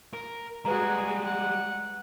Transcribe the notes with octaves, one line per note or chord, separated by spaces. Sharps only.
A#4
G3 G#3 F#4 G#4 B4 A#5
F#5